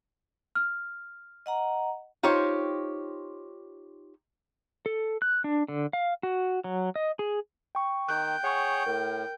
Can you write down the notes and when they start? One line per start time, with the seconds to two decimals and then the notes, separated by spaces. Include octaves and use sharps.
0.55 F6
1.46 D#5 F#5 A#5
2.23 D#4 F4 G4 C5 C#5
4.86 A4
5.22 F#6
5.44 D4
5.68 D3
5.93 F5
6.23 F#4
6.64 F#3
6.96 D#5
7.19 G#4
7.75 G5 C#6
8.09 D#3 G5 F#6
8.44 G#4 C#5 F#5 C#6
8.86 A2 A#4